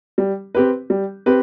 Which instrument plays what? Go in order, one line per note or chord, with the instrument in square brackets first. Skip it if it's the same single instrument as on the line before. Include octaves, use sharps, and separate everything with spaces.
[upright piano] G3
C4 G4 B4
G3
C4 G4 B4